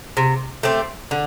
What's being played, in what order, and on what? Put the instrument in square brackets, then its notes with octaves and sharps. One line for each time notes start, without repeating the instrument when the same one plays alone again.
[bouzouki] C3
A3 C4 G4
D3